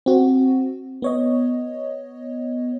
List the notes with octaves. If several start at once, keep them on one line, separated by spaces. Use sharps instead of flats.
C4 F#4
B3 C#5 D#5